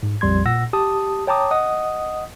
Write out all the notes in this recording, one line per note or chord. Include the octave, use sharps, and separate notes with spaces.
G#2
A#1 F2 G3 C6 G#6
A#2 F#5 E6 A#6
G4 A5 D#6
C#5 G5 A5 A#5 D6 D#6
D#5 F#5 D#6